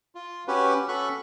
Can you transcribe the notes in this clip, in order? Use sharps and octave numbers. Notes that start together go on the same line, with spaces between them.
F4
C#4 F#4 G4 B4
C#4 F#4 A4 B5 C#6 F#6